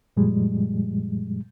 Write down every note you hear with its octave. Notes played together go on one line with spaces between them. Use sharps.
F#2 A#2 F3 G3 G#3